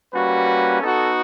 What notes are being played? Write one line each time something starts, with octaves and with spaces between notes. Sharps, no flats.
G3 A#3 C#4 F#4 B4
B3 D#4 F#4 A4